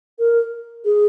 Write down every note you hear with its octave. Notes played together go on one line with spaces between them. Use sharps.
A#4
G#4